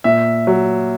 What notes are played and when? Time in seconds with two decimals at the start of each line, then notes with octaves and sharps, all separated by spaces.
0.04 A#2 E5
0.47 F#3